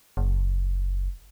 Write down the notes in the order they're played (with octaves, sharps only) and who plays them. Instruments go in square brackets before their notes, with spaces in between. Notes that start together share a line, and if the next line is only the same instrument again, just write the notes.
[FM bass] F#1